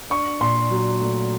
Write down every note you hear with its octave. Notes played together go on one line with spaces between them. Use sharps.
D4 C#6
A#2 C6
F#3
A3